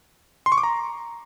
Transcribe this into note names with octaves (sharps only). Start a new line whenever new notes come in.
C6
C#6
D6
A#5